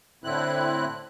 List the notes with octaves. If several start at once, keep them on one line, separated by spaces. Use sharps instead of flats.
A2 D3 C4 E4 F#6